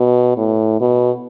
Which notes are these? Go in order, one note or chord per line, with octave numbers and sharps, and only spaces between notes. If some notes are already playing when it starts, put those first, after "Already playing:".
Already playing: B2
A2
B2